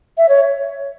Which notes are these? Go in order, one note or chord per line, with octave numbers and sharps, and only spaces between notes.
E5
C#5